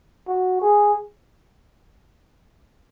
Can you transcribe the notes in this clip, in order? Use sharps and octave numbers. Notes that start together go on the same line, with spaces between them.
F#4
G#4